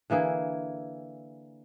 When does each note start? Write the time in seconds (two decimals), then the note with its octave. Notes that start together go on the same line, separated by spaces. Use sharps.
0.10 D3 E3 A#3 G#4